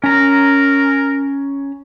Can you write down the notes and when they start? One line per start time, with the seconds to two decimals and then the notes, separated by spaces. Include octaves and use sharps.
0.04 C#4 A#4 A#5